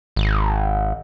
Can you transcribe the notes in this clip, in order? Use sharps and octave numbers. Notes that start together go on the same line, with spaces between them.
G#1